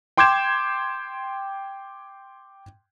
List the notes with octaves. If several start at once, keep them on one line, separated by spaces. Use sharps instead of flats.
G5 C6 D6 G6 G#6 E7